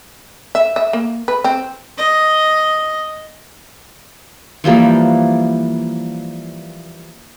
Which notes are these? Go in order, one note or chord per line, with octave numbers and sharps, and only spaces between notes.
E5
E5
A#3
B4
C4
D#5
E3 F3 G3 A#3